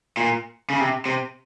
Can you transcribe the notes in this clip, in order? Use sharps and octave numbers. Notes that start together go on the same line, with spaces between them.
A#2
C#3
C3
C3